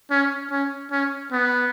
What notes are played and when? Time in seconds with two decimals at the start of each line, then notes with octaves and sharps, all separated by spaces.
0.11 C#4
0.51 C#4
0.91 C#4
1.32 B3